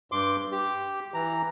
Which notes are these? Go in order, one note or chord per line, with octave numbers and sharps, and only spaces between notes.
G2 C6 D6
G4
E3 A#5